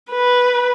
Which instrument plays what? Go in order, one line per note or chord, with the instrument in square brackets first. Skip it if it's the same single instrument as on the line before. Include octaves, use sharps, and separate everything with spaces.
[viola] B4